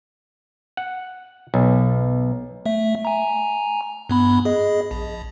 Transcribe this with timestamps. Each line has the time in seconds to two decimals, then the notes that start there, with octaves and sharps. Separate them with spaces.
0.77 F#5
1.54 B1
2.66 A3 E5
3.05 G#5 A#5
4.10 G2 B3 B5
4.45 G#4 D#5
4.91 A#1